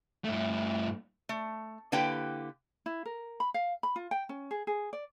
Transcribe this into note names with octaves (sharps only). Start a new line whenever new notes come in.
G2 A3
A3
D3 A#3 E4 G4 B4 G5
E4
A#4
B5
F5
B5
F4
G5
C#4
G#4
G#4
D5